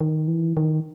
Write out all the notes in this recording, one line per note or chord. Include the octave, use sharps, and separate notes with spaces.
D#3
E3
D#3